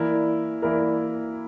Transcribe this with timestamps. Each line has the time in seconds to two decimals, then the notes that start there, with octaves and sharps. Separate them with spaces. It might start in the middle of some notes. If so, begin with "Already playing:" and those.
Already playing: E3 A#3 E4 A#4 D5
0.62 E3 A#3 E4 A#4 D5